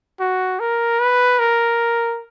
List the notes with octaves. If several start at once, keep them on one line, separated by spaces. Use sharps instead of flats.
F#4
A#4
B4
A#4